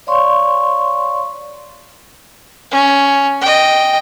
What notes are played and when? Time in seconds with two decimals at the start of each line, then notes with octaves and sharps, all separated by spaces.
0.07 C#5 D5 F5 C6 C#6
2.72 C#4
3.41 D#5 G5